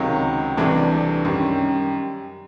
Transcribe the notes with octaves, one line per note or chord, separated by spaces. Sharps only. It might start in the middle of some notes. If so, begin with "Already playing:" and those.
Already playing: C#2 C3 D#3 F#3
C2 C3 E3 A3 D4
F#2 D#3 G3